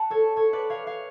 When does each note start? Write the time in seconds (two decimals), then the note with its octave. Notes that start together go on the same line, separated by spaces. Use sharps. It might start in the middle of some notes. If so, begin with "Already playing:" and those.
Already playing: F#5 A5
0.10 A4 C#5
0.36 A4 C#5
0.53 B4 D5
0.70 C#5 F5
0.87 C#5 F5